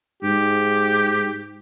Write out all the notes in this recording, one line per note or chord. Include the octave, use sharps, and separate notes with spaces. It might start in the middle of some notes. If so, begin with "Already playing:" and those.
G#2 G4